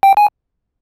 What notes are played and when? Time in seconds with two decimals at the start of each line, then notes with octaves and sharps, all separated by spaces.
0.03 G5
0.17 G#5